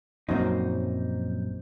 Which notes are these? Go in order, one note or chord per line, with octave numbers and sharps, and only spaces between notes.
A#1 F#2 F#3 A#3 C4 D#4